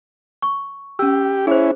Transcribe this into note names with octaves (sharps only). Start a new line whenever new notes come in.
C#6
C#4 G4 E6
C#4 E4 G#4 C5